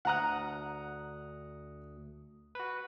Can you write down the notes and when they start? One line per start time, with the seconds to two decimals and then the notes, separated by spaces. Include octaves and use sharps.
0.05 D2 F#5 A#5 D#6 F#6
2.55 F#4 B4